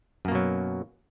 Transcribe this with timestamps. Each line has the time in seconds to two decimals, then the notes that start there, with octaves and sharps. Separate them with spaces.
0.25 F#2
0.28 A#3
0.32 B2
0.35 F#3